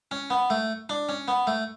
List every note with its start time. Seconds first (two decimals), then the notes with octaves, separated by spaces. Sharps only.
0.11 C#4
0.30 B3
0.50 A3
0.89 D4
1.09 C#4
1.28 B3
1.47 A3